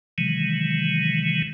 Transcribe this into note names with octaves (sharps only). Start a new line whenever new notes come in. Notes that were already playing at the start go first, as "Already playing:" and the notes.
C3 D#3 E3 F#3 G#3